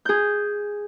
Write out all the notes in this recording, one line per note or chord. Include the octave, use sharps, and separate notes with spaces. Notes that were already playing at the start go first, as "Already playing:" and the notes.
G#4 G6